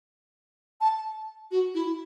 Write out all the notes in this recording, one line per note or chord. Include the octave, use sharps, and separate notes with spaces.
A5
F#4
E4